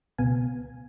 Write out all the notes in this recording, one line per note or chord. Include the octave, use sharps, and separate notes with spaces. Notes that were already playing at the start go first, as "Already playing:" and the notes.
C#2 B2 B3 G#5